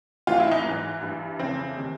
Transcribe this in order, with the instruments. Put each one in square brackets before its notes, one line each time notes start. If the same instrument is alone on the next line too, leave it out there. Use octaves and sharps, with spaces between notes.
[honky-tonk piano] A2 E3 F4
E4
D#4
G#2 E3
G2 E3
F2 C#3 E3 C4
C3 D#3